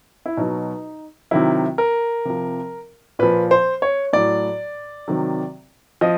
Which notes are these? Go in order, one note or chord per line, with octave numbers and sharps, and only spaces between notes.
E4
B2 F#3 D#4
C3 D#3 F#3 E4
A#4
C3 F3
A#2 F3 B4
C5
C#5
A2 F#3 D5
C3 D#3 F#3
F3 D#5